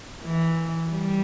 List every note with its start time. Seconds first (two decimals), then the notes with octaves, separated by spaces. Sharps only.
0.23 E3
0.92 G3